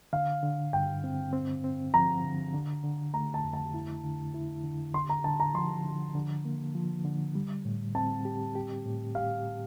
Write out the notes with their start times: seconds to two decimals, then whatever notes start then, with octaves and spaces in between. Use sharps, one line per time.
0.13 D3 F5
0.43 D3
0.73 G2 G5
1.04 C4
1.33 C4
1.64 C4
1.94 F3 A#5
2.24 D3
2.54 D3
2.83 D3
3.14 A3 A#5
3.34 A5
3.44 F2
3.53 A5
3.74 E4
4.04 D3
4.34 E4
4.64 D3
4.94 D3 C6
5.09 A#5
5.24 D3 A5
5.40 A#5
5.54 F3 C6
5.85 D3
6.15 D3
6.45 A#3
6.75 F3
7.05 D3
7.35 G3
7.65 A2
7.95 C4 A5
8.25 G4
8.55 G4
8.86 A2
9.15 G4 F5